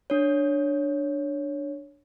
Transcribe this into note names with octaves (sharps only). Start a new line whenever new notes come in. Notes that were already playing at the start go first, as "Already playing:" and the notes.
D4 C#5